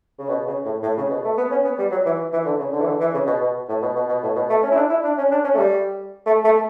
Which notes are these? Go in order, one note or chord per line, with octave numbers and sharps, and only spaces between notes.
C#3
B2
C#3
A2
A2
C#3
B2
A3
B3
C#4
B3
G3
F#3
E3
E3
D3
C#3
D3
E3
D3
E3
C#3
B2
B2
A2
B2
B2
B2
A2
B2
A3
C#4
E4
D4
E4
D4
C#4
D4
C#4
A3
G3
A3
A3